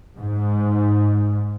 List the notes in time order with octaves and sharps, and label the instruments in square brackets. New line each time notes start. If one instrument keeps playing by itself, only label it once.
[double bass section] G#2